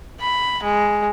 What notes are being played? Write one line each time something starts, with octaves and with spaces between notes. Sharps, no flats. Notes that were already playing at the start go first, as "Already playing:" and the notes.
B5
G#3